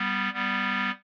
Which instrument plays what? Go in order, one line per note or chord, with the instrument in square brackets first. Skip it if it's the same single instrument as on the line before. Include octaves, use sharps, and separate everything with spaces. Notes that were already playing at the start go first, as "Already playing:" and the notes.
Already playing: [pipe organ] G3 B3
G3 B3